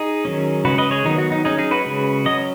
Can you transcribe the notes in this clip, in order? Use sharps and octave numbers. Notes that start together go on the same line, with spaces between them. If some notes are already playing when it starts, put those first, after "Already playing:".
Already playing: D#4 G#4
D#3 F#3 C#4
C#3 G#3 C#4 F#4 B4
B4 D#5
G#4 C#5
D#3 F#3 B3 D#4
F#4
D#4
F#3 C#4 D#4 G#4
D#4 G#4
F#4 B4
C#3 G#3 C#4
F#3 C#4 D#5